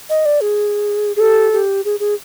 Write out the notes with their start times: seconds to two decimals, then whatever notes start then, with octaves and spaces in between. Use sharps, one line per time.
0.10 D#5
0.25 D5
0.41 G#4
1.17 G#4
1.20 G4 A4
1.53 G4
1.85 G#4
2.00 G#4